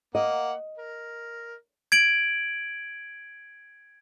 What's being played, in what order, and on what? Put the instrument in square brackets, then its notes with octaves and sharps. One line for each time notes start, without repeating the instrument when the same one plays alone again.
[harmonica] A#3 F#5 [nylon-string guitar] D#5
[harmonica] A#4
[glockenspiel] G#6 D7 F#7